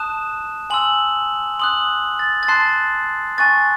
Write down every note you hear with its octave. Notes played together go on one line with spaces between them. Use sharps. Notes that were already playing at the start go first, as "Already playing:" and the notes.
Already playing: A5 D#6 F#6 E7
G#5 C6 E6 F#7
C6 D#6 F#6 F#7
A6
A6
A5 C6 F#6 C7
G#5 C#6 F#6 A6